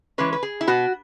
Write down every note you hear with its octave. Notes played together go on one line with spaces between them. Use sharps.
E3 G#3 C#4 B4
B4
G#4
E4
B2 B3 F#4